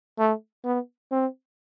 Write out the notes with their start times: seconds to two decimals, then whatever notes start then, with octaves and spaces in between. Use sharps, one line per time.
0.19 A3
0.64 B3
1.12 C4